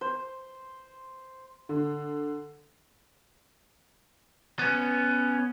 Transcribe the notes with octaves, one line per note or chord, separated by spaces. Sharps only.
C5
D3
B3 C#4